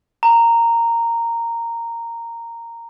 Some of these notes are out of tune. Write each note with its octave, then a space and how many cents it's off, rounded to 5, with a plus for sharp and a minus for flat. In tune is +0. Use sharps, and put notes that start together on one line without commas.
A#5 -10